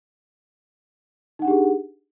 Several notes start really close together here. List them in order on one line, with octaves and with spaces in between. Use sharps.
D#4 F#5 D4 G4 G#4